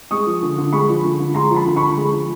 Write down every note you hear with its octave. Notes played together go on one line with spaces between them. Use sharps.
G#3 C#6 D#6
F3
D3
D3
G#3 B5 C#6
F3
D3
D3
G#3 A#5 C6
F3
A5 B5
D3
B5 C#6
D3
G#3
F3